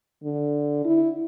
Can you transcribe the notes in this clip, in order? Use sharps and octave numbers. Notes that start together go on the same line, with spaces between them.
D3
E4